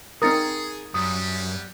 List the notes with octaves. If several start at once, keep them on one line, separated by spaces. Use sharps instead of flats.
C4 D#4 G#4 A#4 D#6 A6 C#7
F#2 G3 B3 D#6